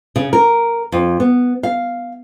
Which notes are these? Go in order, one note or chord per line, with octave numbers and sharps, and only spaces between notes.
C#3
A#4
F2
B3
F5